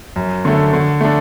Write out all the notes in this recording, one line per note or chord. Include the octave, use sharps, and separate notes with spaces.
F#2
D3 A3
D3
A3 D4